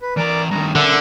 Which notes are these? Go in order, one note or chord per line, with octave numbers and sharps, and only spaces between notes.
B4
E3 A#4 D5 A#5 D6
G2 D#3 A#5
D3 A#4 E5 F#5